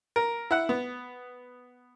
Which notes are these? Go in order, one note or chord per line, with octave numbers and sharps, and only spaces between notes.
A#4
E4 F#5
B3